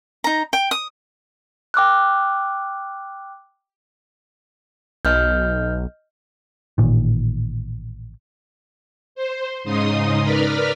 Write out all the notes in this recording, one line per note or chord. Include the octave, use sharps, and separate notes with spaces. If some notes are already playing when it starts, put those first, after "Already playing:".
D#4 A#5
G5
D#6
G5 D6 F6 F#6
B1 D#5 F6 G6
A1 A#2 D#3
C5
G#2 C#3 D#4 C6 D#6
A#4 B4 D5 B5 F6